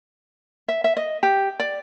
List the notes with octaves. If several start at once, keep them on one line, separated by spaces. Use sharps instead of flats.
E5
E5
D#5
G4
D5